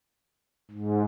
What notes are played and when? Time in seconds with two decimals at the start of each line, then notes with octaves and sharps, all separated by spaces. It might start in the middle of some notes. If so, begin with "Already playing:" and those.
0.71 G#2